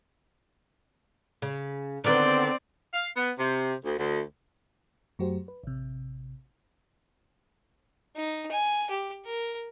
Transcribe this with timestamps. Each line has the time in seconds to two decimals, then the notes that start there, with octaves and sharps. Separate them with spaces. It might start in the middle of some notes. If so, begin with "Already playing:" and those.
1.42 C#3
2.04 D3 D#3 B3 C4 D5
2.94 F5
3.17 B3
3.39 C3
3.85 D2
3.98 D2
5.19 F#2 F#3 A3 F#4 G4 C5
5.48 B4
5.63 A1 C3
8.16 D#4
8.51 G#5
8.90 G4
9.25 A#4